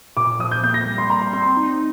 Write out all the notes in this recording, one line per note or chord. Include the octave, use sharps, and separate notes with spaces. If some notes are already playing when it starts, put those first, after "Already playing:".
A#2 D6
F3 D#6
G6
A#3 G6
A#6
G3
C6
G3 A#5
C6
C4 C6
D#4